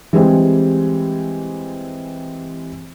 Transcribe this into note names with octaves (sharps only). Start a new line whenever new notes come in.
E3 G3 G#3 C4